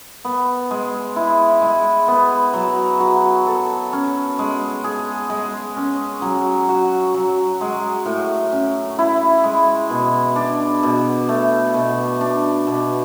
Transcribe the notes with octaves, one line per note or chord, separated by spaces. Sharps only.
B3
G#3
E4
G#3
B3
F#3
F#4
A4
C#4
G#3
G#4
G#3
C#4
F#3
F#4
F#3
G#3
A2
C#4
E4
G#3
B2
D4
B2
A3
B2
D4
B2